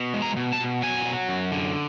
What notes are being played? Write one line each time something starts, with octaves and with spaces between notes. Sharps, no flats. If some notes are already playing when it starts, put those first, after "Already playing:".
Already playing: B2
G#3
A#5
B2
A5
B2
F#3 G#5
F#3
F#2
D3